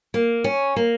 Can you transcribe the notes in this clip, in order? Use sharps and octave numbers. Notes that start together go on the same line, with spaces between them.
A#3
C#4
A#3